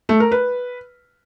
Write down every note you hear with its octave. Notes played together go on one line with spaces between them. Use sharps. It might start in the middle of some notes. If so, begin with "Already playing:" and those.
A3
A#4
B4